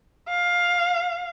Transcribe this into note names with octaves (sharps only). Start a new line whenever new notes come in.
F5